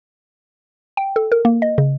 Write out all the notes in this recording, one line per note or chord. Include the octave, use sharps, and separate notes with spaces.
G5
A4
A#4
A#3
D#5
C#3